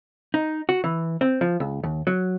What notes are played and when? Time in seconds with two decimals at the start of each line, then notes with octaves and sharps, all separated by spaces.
0.34 D#4
0.69 F#4
0.84 E3
1.21 C4
1.41 F3
1.60 C#2
1.83 D#2
2.07 F#3